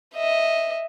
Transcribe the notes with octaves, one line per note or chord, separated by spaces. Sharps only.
D#5 E5